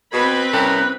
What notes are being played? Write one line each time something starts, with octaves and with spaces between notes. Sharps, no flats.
B2 C4 B4 B5 G#6
C2 C#4 A#4 G5 F#6